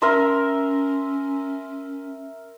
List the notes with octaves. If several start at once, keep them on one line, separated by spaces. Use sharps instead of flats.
C#4 A#4 E5 C6